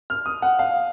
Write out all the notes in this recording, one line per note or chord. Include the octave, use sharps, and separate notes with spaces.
F6
D#6
F#5
F5